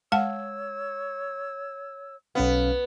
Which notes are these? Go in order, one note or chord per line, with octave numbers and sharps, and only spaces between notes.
G#3 C#5 F#5 A5 E6
B1 B3 C#4 F5